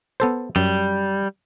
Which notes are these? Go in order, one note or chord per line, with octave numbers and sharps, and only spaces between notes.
B3 A4 C5
F#2 G3